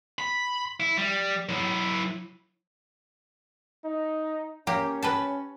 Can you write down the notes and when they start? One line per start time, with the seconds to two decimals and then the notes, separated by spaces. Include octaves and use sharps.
0.19 B5
0.80 E4
0.97 G3
1.49 F#3 E4
3.84 D#4
4.67 A#3 C#4 G4
5.02 B4 G5 A5